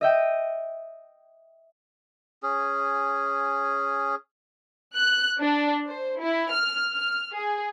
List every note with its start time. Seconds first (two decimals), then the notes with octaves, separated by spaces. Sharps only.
0.01 D#5 E5 G5 D#7
2.43 C#4 G#4
4.95 F#6
5.40 D4
5.85 C5
6.19 E4
6.51 F6
6.94 F6
7.34 G#4